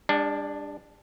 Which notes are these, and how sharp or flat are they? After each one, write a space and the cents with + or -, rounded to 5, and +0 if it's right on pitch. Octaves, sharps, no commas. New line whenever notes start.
G3 +45 D4 +0